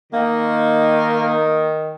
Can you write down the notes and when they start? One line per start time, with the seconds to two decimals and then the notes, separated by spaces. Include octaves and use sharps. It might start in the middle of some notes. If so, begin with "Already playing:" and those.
0.13 D#3 A#3